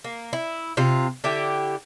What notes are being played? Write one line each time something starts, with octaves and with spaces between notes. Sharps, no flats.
A#3
E4
C3 F4
D3 E4 G4